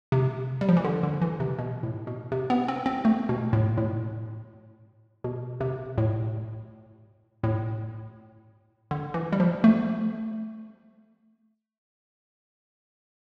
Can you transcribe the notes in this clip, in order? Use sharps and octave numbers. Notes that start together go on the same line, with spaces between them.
C3
G3
F3
E3
D3
D3
E3
C3
B2
A2
B2
C3
B3
C4
C4
A3
B2
A2
A2
B2
C3
A2
A2
D3
E3
G3
F3
A3